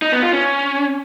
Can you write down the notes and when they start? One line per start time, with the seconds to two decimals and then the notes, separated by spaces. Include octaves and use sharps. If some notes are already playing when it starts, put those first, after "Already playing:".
0.02 D#4
0.12 B3
0.23 F4
0.33 C#4